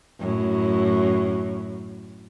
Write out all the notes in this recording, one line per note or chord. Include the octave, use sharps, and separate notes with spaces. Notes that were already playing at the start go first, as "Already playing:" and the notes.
F#2 A2